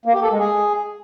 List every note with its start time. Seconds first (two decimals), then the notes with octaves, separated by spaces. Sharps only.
0.05 A#3
0.14 G4
0.23 A4
0.31 G#3
0.40 G#4